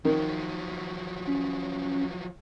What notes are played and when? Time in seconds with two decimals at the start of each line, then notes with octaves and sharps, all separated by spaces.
0.05 D#3 F3 F#3
1.27 C#4